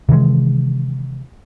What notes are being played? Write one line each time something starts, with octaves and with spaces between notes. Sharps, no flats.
C3 D#3 E3 G#3